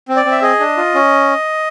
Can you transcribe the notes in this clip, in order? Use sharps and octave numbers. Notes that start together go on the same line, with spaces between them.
C4
D5
C4
E5
G#4 D#5
D4
F4
C#4